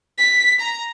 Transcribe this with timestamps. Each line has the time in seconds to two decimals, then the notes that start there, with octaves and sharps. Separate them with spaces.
0.18 B6
0.60 A#5